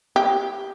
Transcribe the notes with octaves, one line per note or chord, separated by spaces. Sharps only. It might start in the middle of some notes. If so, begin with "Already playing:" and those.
G4